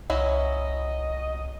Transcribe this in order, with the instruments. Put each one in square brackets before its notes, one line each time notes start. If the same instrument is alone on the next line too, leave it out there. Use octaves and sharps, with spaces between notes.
[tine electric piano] C2 [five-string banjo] F#3 C#4 E4 [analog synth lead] D#5